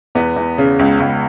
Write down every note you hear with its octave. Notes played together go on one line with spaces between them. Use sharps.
E2 B3
E2
C#3
C#2
C#2